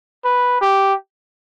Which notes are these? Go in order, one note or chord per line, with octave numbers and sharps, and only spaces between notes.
B4
G4